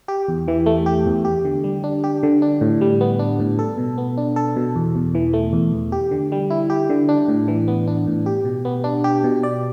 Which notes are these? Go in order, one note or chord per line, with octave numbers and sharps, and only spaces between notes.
G4
E2
E3
A3
G4
E2
G4
D3
G3
D4
G4
D3
D4
A2
G3
B3
D4
A2
A4
B2
B3
D4
A4
B2
E2
E2
E3
A3
E2
E2
G4
D3
G3
E4
G4
D3
D4
A2
E3
B3
D4
A2
G4
B2
B3
D4
G4
B2
D5